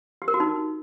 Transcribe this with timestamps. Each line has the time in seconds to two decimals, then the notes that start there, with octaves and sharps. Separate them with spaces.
0.22 G4
0.28 A#4
0.34 F#4
0.40 D#4